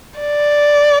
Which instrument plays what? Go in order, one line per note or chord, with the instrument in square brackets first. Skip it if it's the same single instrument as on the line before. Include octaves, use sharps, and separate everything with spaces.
[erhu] D5